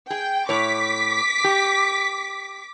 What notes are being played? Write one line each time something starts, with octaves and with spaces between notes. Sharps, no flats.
G#4 G5
A2 C#5 D6 B6
G4